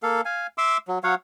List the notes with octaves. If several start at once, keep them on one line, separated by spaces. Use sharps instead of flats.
A#3 A4 F5
F5 G#5
E5 C6 D6 E6
F#3
F#3 C#5 F5 F#5